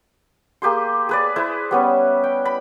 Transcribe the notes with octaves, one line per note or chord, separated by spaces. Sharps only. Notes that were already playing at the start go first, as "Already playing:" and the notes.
A#3 G4 G#4 C6
G#4 B4 D5
E4 G#4 B4 C5
G3 B3 C#4
G5
B5